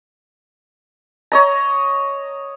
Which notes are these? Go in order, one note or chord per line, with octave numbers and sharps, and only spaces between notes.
C#5 D#5 A#5